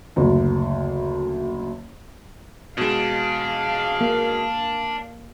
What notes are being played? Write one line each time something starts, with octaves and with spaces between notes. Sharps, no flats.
F#1 D2
B2 G#3 D4 F5
A#3